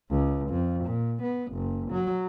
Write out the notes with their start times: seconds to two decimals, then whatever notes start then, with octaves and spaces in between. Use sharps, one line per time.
0.10 C#2
0.50 F2
0.85 A#2
1.23 B3
1.53 F#1
1.92 F#3